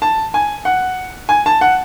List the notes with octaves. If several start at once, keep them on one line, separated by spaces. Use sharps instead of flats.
A5
G#5
F#5
G#5
A5
F#5